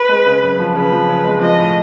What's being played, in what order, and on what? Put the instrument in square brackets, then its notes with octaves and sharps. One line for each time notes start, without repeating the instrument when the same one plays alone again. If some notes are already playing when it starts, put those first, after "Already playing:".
Already playing: [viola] B4
[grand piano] G#3
C#3
F#2
F3
[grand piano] C#3 [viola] B4
[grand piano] F3
C#3
G#3
[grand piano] F3 [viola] D#5
[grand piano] A2